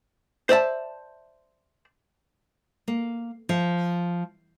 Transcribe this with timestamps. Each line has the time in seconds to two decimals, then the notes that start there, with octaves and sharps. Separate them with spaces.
0.49 C5 D5 E5 A5
2.88 A#3
3.49 F3